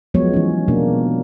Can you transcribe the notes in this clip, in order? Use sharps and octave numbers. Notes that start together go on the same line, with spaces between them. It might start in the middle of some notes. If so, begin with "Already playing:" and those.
F3 F#3 G#3 B3 C#5
E3 C#4
B2 A#3 D4